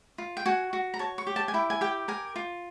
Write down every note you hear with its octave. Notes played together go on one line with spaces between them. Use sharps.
F4
G5
F#4 G#5
F#4
A#5
C#5 A5
C#6
G4
A5
G#5
E4 G5
G#5
G4 G5
A#4 G#5
F4